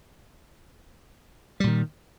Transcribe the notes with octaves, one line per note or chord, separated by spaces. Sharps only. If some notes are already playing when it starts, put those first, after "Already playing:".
A#2 D#3 G3